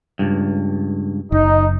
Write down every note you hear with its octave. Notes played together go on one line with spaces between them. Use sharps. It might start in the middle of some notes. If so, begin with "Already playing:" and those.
C#2 G2
F#1 D#4